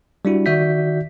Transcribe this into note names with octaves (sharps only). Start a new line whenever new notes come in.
G3 D4 E4 F#4
D#3 F#4 D5 E5 G6 B6